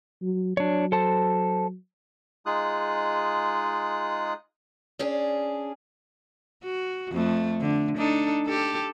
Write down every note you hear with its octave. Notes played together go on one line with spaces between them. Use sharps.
F#3
F#3 D4 C#5
A4 C5 A5
G#3 D#4 F4 G#4 D#6 F#6
C#4 D4 G#4
F#4
F2 A3
D3
D4 D#4 A4
G4 A4